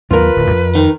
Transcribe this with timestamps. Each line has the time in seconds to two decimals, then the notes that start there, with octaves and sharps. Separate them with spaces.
0.11 D#2 F#3 B3 F4 A#4 B4
0.36 D1
0.50 F2
0.75 D#3